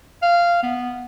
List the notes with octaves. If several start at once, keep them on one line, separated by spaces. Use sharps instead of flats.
F5
B3